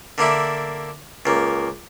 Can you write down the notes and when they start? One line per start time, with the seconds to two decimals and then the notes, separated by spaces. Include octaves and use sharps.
0.18 D3 A#3 D4 E4
1.26 C#2 A#3